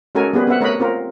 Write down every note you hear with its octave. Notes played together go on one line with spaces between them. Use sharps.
G#3 C#4 F#4 A4 A#4 G#5
G3 A#3 B3 G#4 B4
B3 C4 B4 E5 F#5
A3 A#4 C#5 D#5 F#5 B5
C4 F4 A#4